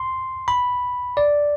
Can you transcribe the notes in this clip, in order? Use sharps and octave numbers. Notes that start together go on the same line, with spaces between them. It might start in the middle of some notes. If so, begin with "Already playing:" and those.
Already playing: C6
B5
D5